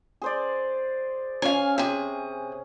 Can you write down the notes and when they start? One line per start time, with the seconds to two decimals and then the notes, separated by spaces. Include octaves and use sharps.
0.22 G#4 C5 D5
1.42 C#4 F5 G#5
1.78 C3 G#4